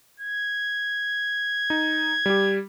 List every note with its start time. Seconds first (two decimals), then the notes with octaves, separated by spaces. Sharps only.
0.20 G#6
1.70 D#4
2.26 G3 G4